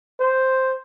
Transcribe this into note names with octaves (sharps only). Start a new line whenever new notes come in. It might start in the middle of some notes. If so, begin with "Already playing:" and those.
C5